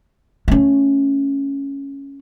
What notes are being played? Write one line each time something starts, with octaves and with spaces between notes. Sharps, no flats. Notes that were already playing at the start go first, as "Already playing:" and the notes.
A3 C#4